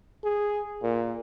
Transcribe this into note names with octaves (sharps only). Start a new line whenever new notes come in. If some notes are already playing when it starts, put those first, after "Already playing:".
G#4
A#2